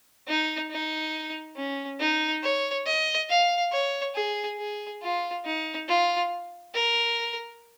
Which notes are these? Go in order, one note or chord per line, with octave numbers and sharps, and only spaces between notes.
D#4
D#4
C#4
D#4
C#5
D#5
F5
C#5
G#4
G#4
F4
D#4
F4
A#4